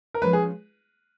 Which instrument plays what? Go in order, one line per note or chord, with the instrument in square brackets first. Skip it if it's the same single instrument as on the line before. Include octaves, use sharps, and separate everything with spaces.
[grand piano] A#4
[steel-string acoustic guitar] F3 G#3 C#4 [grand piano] B4
[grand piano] G#4